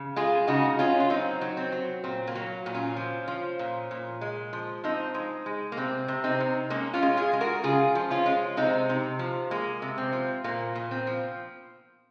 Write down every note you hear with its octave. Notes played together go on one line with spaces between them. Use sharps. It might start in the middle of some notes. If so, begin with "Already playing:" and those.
Already playing: C#3
G#3 F4 G#4
C#3 D#4 F#4
G#3 C#4 F4
F4
F#3 C4 D#4
F#3
C4
F#3
A#2 C4
A#3
F#3
A#2
C#4 F4
F3
F3
A#2
A#2
G#3
F3
F3 C4 D#4
G#3
G#3
A#3
C3 C4
C3
C4 D#4
C3
G#3 A#3 C#4
C#4 F4
G#3
F4 G#4
G#3
F#4 A#4
C#3 F4 G#4
F3
C#4 F4
G#3
C3 C4 D#4
C3
F3
G#3 A#3
C3
C4
F3
A#2 A#3
A#2
C4
F3